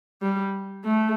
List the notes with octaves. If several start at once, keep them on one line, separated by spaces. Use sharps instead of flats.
G3
A3